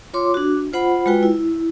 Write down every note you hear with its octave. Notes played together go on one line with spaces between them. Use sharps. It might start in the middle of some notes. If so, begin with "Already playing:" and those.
F4 C#5 C6 D6
D4 F#4
F4 C5 F#5 B5
G#3 F4 F#4 B4 G5
E4